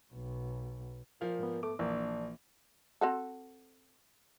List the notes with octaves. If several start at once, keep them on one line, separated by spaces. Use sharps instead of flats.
B1 B2
A#2 F3 F5
G#2 B3
A3 D6
A#1 E3 A#3 D4
C4 F#4 A4